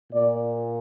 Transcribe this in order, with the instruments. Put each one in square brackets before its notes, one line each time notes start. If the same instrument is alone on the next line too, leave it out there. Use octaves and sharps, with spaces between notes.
[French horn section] A#2 D5